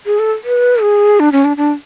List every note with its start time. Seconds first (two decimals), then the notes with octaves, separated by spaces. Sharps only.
0.06 G#4
0.19 A4
0.44 B4
0.82 G#4
1.20 D4
1.32 C#4
1.45 D4
1.57 D4